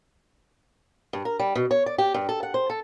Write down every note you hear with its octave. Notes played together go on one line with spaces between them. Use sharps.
G2
A#4
G3
B2
C#5
D5
G4
G2
A4
F#5
C5
A4